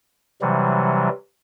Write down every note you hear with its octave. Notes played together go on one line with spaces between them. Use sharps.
C3 E3 F#3 G3